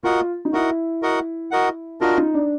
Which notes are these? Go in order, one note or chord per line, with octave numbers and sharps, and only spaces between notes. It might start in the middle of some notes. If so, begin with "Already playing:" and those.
F4 F#4 A#4 D#5 F#5
D#4
E4 F#4 A#4 D#5 F#5
F#4 A#4 D#5 F#5
F#4 A#4 D#5 F#5
D4 F4 F#4 A#4 D#5
D#4
D4